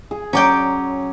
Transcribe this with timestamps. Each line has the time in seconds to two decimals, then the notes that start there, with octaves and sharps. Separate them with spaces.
0.11 G#4
0.33 F#3 C#4 D5 G5